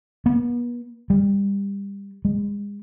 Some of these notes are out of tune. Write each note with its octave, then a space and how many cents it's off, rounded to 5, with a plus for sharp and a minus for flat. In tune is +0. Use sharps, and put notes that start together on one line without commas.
B3 -40
G3 +25
G#3 -35